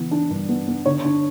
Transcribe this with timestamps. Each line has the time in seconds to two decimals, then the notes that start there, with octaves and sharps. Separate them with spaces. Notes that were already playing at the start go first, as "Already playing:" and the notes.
Already playing: E3 B3
0.11 D4
0.30 G2
0.49 B3
0.68 B3
0.86 D3 C#5
1.05 D4